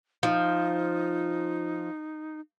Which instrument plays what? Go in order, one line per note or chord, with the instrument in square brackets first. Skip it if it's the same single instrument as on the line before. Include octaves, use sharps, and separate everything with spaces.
[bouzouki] F3 [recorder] D#4